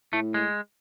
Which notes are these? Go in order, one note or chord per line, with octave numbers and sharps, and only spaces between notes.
A2 A3
G#3